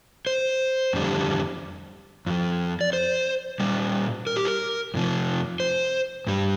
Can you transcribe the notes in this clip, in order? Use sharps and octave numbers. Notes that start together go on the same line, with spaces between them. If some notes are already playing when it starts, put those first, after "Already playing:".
C5
F2 D3 G3
F2 F3
D5
C5
A#2 G3
A#4
G4
A#4
F2 C3 F3
C5
G2 G3